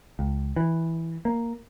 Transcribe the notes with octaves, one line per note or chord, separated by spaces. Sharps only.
C#2
E3
A#3